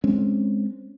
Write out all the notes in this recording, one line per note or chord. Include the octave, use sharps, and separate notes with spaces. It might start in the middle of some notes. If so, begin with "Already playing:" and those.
G#3 C4 C#4